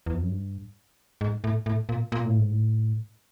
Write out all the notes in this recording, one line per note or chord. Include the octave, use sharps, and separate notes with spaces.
E2
F2
F#2
G2
G#2
A2
A2
A#2
A#2
A2
G#2
A2